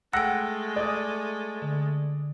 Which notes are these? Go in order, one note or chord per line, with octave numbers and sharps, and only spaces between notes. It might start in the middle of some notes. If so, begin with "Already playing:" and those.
G#3 A3 F#5 G5 E6 F#6 A#6
D5 D#6
D3